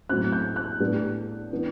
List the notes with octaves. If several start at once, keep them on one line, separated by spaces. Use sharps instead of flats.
A2 F#3 C4 F#6
G6
F#6
A2 G3 B3 D4
E3 B3 D4